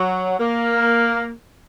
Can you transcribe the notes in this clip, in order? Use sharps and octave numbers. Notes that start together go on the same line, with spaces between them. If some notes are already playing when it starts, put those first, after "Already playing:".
Already playing: F#3
A#3